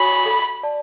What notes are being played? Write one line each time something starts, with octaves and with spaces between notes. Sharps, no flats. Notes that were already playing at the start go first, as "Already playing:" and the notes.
Already playing: F#4 C#5 G#5 B5 C#6
A4
D5 A5